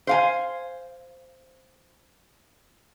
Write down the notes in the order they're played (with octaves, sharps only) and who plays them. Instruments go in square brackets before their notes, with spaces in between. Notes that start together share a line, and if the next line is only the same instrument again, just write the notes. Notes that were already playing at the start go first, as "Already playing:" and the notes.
[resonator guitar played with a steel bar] C5 F5 G#5